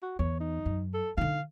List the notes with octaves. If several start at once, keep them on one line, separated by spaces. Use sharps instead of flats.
F#4
E2 C#5
D#4
F#2
A4
D3 D#4 F5